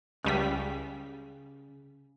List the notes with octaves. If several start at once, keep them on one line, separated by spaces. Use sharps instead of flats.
C#2 C#3 G3 B6